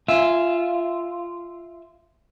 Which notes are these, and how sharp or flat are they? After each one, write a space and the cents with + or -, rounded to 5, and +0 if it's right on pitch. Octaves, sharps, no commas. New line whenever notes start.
F4 -15 E5 +0 G#5 +0